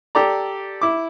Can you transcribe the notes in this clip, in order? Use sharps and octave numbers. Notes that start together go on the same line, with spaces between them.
G4 A4 D5 A#5
E4 D6